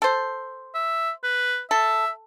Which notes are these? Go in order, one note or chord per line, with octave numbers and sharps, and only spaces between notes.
A4 C5
E5
B4
A4 E5